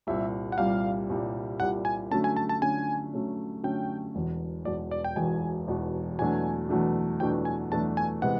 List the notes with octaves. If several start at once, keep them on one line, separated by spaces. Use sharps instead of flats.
C2 A#2 G3 E5
F#5
C2 A#2 G3 F5
C2 A#2 G3
C2 A#2 G3 F#5
G#5
D3 F#3 A3 C#4 A5
G#5
A5
A5
D3 F#3 A3 C#4 G#5
D3 F#3 A3 C#4
D3 F#3 A3 C#4 G5
E1 E2 B2
E1 E2 B2 D5
D5
G5
E1 E2 B2 G#5
E1 E2 B2
E2 B2 F#3 A3 D4 G#5
E2 B2 F#3 A3 D4
E2 B2 F#3 A3 D4 G5
G#5
E2 B2 F#3 A3 D4 A5
G#5
C3 E3 G#3 B3 F#5